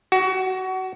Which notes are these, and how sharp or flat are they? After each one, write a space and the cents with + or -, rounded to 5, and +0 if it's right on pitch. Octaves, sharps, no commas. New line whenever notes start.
F#4 +25